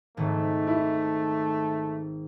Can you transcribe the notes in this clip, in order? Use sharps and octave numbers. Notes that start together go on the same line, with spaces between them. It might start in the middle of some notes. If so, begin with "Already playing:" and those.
G#1 A3
E4